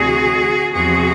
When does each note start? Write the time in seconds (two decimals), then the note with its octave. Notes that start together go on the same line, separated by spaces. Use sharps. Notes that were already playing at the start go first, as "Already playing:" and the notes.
Already playing: D2 C3 E3 F#4 G#4
0.74 E2 C3 F3 F#4 G#4